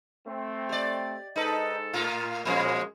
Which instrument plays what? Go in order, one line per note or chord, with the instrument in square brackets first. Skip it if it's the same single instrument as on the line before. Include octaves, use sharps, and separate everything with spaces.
[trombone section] A3 C4
[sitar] G4 D5
[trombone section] G#2 A4 [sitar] D#4 B4
[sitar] A2 A#3 F4
[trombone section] F#2 G#3 [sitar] A#2 F3 C#4